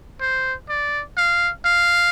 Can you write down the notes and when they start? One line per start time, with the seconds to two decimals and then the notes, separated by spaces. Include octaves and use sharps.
0.20 C5
0.69 D5
1.17 F5
1.65 F5